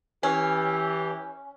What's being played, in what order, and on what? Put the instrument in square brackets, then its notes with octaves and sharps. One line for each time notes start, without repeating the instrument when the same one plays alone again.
[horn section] E3 G4 [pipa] C#4